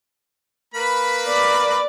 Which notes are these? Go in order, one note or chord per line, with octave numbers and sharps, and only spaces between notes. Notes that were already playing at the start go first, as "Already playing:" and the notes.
A#3 B4 B5
D5